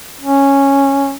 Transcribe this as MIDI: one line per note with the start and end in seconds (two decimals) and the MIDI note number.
0.21 1.15 61